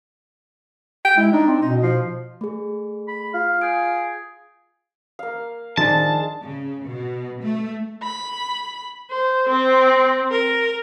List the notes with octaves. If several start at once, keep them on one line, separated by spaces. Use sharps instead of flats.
G5
G#3 E4
D4 D#4
C4
B2 D#4
F3
A3 G#4
B5
F4 F5
G#4 G6 D7
A#3 F5
D#3 F3 G#3 D4 A5
C#3
B2
A3
B5
C5
C4
A#4